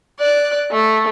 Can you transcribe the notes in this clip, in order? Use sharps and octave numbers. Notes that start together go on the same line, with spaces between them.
D5 F#6
A3